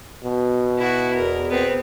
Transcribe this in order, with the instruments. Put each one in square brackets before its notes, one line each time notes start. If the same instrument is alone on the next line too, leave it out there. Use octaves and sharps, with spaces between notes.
[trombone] B2
[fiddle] E4 F#4
[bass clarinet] E2 [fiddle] A#4
[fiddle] B3 C4